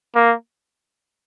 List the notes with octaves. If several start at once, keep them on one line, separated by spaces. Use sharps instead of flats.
A#3